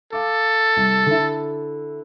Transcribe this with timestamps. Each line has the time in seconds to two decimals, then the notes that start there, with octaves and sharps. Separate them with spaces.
0.13 A4 F5 D6
0.77 C2
1.06 D3 E4